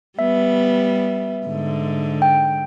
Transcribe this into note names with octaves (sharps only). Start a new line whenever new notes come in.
G3 B3 E5
G#2 D3
G5